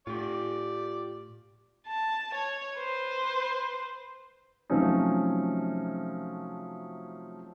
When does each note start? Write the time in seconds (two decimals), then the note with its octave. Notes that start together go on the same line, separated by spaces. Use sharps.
0.07 A2 F4 G4 D5
1.88 A5
2.34 C#5
2.77 B4 C5
4.70 C3 F3 F#3 A3 C#4 D#4